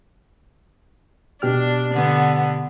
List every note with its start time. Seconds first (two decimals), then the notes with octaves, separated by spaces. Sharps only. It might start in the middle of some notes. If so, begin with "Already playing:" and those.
1.42 B2 D4 G4 F6
1.94 D3 B3